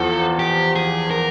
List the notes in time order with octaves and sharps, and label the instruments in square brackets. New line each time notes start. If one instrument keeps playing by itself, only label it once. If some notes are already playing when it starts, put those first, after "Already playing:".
Already playing: [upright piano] E2 F3 [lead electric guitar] A4
[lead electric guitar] G4
G#4
A#4